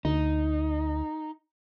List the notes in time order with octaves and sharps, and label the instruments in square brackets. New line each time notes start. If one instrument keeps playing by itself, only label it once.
[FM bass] D2 [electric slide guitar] D#4